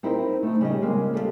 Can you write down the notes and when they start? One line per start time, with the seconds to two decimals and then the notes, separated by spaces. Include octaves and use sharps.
0.03 C4 D#4 E4 A#4 C5 D#5
0.43 A3 D#4
0.61 C#3 G3 C#4 D#5
0.82 C#3 G#3 A#3 C4
1.14 G3 A4 D#5 F5